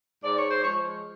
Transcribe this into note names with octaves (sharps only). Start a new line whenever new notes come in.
G#2 D5
C#5
C5
F3 G#3 C#5